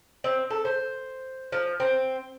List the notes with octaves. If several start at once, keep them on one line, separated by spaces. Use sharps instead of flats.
C4
A4
C5
F3
C4